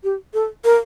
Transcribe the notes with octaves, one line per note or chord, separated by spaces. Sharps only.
G4
A4
A#4